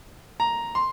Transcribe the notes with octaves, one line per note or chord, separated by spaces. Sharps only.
A#5
C6